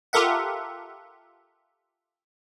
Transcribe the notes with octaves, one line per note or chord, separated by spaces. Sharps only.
F4 G4 A4 A#4 E5 F#5